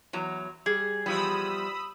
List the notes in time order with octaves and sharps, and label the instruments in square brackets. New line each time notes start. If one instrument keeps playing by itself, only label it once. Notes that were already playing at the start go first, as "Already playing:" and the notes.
[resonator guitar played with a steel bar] E2 F#3 A#5
[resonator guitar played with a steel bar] G3 [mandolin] G#4
[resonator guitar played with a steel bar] E2 F3 G3 [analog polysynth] B5 D#6 E6